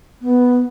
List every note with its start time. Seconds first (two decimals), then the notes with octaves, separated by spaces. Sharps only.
0.22 B3